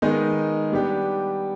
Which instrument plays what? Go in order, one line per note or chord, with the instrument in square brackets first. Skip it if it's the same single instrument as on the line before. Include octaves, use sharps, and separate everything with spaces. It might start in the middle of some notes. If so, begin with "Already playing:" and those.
[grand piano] D#3 G#3 B3 D#4
G3 B3 D4 G4